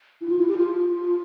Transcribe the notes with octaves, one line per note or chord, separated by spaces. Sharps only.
E4
F4
E4
G4
F4